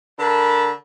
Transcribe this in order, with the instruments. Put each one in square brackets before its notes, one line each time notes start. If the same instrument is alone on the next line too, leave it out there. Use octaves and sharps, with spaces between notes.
[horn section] D3 A#4 A5 B5